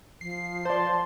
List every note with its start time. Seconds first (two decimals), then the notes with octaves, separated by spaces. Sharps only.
0.21 F3 C7
0.65 C5 D5 A5 C6